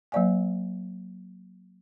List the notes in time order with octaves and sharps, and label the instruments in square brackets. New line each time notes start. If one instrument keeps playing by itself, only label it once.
[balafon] F#3 A#3 C5 D5 F5 G#5